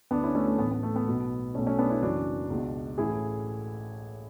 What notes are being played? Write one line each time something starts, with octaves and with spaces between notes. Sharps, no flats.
D2 D3 B3 D4
C#4 E4
A3 C#4
A3
A1 A2 E3 B3
B3
A3
B3
B1 B2
B1 B2 A3 C#4
A3 C#4
B3 D4
C#4 E4
F#1 F#2 E3 D4 F#4
C#2 B2
A1 A2 E3 E4 G#4